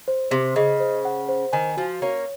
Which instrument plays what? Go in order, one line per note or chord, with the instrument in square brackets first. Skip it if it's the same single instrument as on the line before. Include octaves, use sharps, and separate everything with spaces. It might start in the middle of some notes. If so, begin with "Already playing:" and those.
[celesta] C5
[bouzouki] C3 [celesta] C5
[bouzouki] C#3 [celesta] D#5
[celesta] C5
F#5
C5
[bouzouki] D#3 [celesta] G#5
[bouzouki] F3 [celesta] F#4
[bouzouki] A#3 C#4 [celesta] C#5